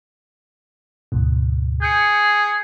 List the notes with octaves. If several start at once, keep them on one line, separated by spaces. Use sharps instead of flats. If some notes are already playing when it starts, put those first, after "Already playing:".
D2 G#2 B2
G#4 G6 C#7